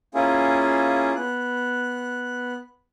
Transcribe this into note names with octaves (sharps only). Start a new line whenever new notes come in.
A#3 C#4 E4 F4 G#4
B3 F#6